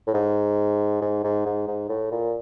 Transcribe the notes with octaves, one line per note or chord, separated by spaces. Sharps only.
A2
G#2
G#2
G#2
G#2
G#2
A2
A#2